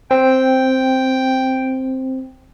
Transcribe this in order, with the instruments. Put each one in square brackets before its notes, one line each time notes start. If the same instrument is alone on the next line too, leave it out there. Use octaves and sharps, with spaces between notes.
[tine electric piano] C4 [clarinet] G5